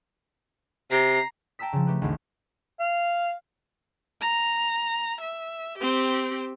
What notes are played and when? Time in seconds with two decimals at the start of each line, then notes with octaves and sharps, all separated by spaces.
0.91 C3 A#5 C7
1.59 G5 A5 A#5 E6 B6
1.73 C#3 F3
1.87 A3 G4 B4
2.02 G#1 D2
2.79 F5
4.21 A#5
5.21 E5
5.78 C4 G4